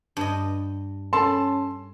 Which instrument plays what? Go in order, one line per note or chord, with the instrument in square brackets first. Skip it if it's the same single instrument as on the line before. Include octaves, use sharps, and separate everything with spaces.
[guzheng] G2 D#5
[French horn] C#4 [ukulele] A4 A5 B5 [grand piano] C6